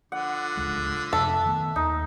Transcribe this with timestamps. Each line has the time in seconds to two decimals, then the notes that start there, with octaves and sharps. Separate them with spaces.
0.12 D3 F3 F#5
0.57 D1 C#2 G#3
1.13 F2 C3 A4 E5
1.46 D#3 A3 B3
1.76 D#2 D#4